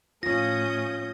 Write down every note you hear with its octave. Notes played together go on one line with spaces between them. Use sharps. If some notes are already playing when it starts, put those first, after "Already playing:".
A2 C#4 F4 D#6 G6 A#6